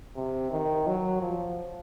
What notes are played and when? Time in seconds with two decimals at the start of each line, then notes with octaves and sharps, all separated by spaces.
0.17 C3
0.51 D#3
0.87 F#3
1.21 F3